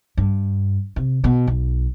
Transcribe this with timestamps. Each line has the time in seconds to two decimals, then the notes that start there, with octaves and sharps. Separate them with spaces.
0.17 G2
0.96 C3
1.24 B2
1.47 B1